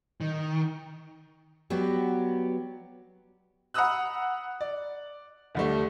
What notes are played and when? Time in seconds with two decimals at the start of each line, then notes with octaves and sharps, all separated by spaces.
0.20 D#3
1.70 F#3 G3 B3 F#4 G4
3.74 F#5 A#5 B5 D#6 E6 F#6
4.61 D5
5.55 D2 G3 A3